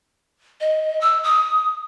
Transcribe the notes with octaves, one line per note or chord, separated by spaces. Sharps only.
D#5
E6
D#6